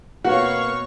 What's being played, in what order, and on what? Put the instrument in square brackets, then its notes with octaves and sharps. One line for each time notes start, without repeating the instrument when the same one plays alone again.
[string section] B2 C#5 C#6 [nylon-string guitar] A#3 C4 B4 [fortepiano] F#4 [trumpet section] F5